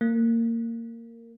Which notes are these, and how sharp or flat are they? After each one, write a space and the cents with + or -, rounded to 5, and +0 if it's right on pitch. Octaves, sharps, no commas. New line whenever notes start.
A#3 -20